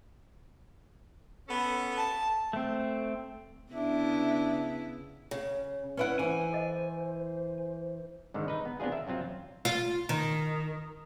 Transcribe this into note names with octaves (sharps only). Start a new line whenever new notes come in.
B3 C#4 A4
A5
A3 C4
C#3 B3 D4 E4 E5
C#3
C#4 E4 B4 D5 F#5
E3 C5 G#5
A4 D#5 F#5
G#2 D3 D#3
D#4 B4
B3
B3 C4 D4 F4 G#4
A#4 E5
F#2 F#3 C4 F4
F4
D#3